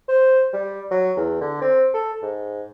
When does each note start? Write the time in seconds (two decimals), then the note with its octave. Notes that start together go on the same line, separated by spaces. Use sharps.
0.09 C5
0.53 G3
0.91 F#3
1.17 E2
1.41 D3
1.62 C4
1.94 A4
2.22 G#2